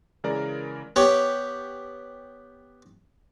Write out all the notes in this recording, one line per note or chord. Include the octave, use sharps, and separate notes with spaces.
C#3 E3 G#3 A#4 D5 A#5
B3 G4 C#5 G5